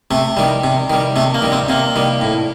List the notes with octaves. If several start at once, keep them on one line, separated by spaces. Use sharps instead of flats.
C3 A3
D#3 G3
C3
D#3 G3
C3 A3
A#3
D#3 G3
C4
C3 A#3
D#3 G3
A2